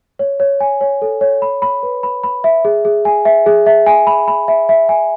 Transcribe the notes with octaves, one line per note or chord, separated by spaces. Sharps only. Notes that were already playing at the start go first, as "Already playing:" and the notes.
C#5
C#5
G#5
C#5
A4
C#5
B5
B5
B4
B5
B5
E5
G#4
G#4
G#5
E5
G#4
E5
G#5
B5
B5
E5
E5
G#5